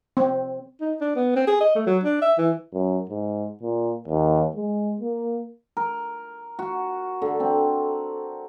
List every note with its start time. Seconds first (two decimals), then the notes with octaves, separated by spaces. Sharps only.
0.17 C4
0.81 D#4
1.01 D4
1.15 B3
1.36 C4
1.47 G#4
1.61 D#5
1.75 A3
1.86 F#3
2.03 D4
2.21 E5
2.38 E3
2.74 F#2
3.10 G#2
3.63 A#2
4.08 D#2
4.56 G#3
5.01 A#3
5.77 A#4
6.59 F#4
7.22 D3
7.40 C4